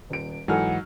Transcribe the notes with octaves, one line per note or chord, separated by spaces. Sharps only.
D#1 D7
G#2 E3 F#3 D#4 A4 F#5 G#5 F6